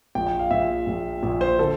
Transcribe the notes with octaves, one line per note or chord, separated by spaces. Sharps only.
A#1 A#2 G5
G5
F5
A#1 A#2 E5
A#1 A#2
A#1 A#2
C5
D3 A4